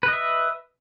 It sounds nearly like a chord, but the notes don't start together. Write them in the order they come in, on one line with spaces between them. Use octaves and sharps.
B4 D#5 E5